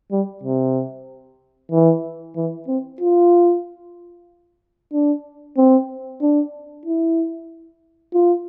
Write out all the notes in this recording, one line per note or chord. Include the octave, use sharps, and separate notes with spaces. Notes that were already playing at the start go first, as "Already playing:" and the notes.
G3
C3
E3
E3
C4
F4
D4
C4
D4
E4
F4